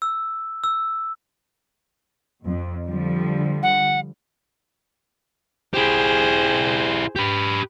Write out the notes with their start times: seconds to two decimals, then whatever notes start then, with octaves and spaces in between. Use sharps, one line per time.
0.02 E6
0.64 E6
2.45 F2
2.85 D3 F3 G3
3.63 F#5
5.74 E4 G4 G#4 C5
7.16 G4 B4